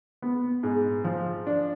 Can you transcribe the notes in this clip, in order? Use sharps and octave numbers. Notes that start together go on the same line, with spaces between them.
B3
G#2
F3
D4